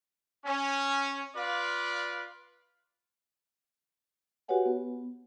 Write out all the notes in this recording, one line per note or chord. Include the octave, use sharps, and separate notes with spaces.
C#4
F4 B4 D5 F5
F#4 G4 B4 C#5 F#5 G#5
B3